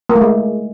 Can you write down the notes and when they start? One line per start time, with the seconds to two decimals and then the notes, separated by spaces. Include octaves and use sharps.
0.09 A#3
0.15 A3
0.21 G#3